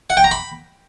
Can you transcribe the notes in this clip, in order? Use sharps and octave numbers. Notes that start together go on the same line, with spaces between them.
F#5
G5
A#5
B5